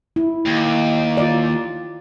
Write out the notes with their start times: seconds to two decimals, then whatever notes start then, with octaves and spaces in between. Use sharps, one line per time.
0.16 E4
0.46 D#2
1.17 F4 D5